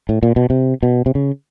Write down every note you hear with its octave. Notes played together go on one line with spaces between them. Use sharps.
A2
A#2
B2
C3
B2
C3
C#3